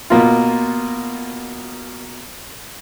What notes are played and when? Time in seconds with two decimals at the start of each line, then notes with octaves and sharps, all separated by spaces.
0.10 B2 A#3 F4